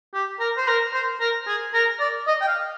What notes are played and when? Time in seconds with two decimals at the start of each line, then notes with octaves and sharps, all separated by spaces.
0.14 G4
0.40 A#4
0.57 C5
0.68 A#4
0.93 C5
1.20 A#4
1.48 G#4
1.74 A#4
2.00 D5
2.27 D#5
2.42 G5
2.48 F5